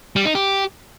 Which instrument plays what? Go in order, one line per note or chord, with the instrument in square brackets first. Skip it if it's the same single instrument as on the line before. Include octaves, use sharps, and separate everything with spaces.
[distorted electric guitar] G3
D#4
G4